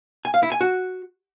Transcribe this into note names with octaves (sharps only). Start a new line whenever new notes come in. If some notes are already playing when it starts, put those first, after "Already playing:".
G#5
F5
E4
G#5
F#4